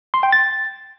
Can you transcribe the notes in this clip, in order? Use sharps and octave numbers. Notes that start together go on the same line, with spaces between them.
C6
G5
A6